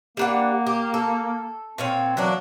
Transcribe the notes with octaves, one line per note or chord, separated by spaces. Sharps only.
G3 A#3 D4 F#5
G4
A4
A#2 C4 C#5 F5
E3 F#3 A#3 D4